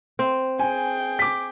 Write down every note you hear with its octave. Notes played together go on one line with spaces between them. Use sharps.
C4
G#4 G5 G#5
D6 B6